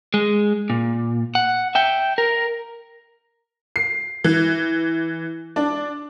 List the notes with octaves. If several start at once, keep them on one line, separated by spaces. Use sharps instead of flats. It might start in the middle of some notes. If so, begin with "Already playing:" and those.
G#3
A#2
F#5
E5 G5
A#4
C7
E3
D4